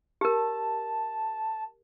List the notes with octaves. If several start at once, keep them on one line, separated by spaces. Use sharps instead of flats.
G4 A#4 A5